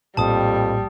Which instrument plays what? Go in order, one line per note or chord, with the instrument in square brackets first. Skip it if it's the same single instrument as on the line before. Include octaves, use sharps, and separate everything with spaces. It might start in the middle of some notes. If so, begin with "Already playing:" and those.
[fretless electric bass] A#1 A2 A#3 [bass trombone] F2 [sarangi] G3 [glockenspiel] A5 D#6